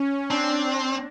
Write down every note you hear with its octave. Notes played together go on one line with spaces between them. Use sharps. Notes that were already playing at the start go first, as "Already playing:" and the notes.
Already playing: C#4
C4 D4